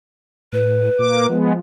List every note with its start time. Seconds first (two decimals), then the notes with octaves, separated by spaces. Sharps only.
0.53 A2 B4
0.99 A#2 A#3 D6
1.29 F3 G#3 B3